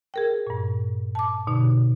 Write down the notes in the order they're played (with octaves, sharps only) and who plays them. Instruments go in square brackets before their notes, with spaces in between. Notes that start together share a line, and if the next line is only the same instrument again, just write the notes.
[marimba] G#4 A#4 G5
G2 A#2
A5 D6
B2 D3 D#4